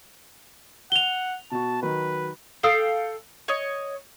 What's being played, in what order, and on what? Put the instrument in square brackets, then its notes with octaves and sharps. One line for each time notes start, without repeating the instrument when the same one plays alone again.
[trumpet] F#5 [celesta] F7 G7
[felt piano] B2 F#4 [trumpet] A5
[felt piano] D#3 F#3 [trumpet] B4
[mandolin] A4 F5 G5 D#6
C#5 D#5